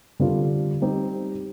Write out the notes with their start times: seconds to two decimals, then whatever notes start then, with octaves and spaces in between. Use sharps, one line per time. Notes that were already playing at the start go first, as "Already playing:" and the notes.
0.20 D3 G3 C4 F4 A4
0.82 G3 C4 D#4 G4